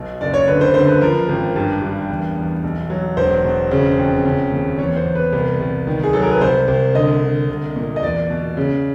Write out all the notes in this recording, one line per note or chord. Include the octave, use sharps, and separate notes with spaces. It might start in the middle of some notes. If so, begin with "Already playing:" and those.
Already playing: B1 B2
F#1 D5
C#5
D3 B4
C5
D3 C5
B4
F3 A#4
G#1
G2
G2
E2
E2
B1
F#3
E1 C5
B2
C#3
F2
C#3
D#2
E2 C#5
C5
E2
B4
C2
C2
D#3
G#4
F#3 A4
A#4
B4
C2 C5
C2
D3 D#5
D3
C2
A#2
D#5
E2 D5
B2
C#3